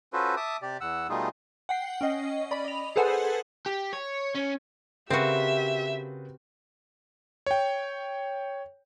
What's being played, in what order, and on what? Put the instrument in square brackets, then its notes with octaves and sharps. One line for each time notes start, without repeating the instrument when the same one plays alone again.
[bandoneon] C#4 F4 F#4 A4 B4 C5
E5 A5 D6 D#6
C3 G4 D5
E2 F#5 E6
B2 G3 A3 D#4 F4 G#4
[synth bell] F#5 G5 C7
C#4 D#5
D5 B5
D#5 F7
G#4 A4 B4 C5 F#5 G#5
[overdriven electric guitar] G4
C#5
C#4
[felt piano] C#3 A#4 B4 [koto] C4 F#4 [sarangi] G4 [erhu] E5
[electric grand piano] C#5 G5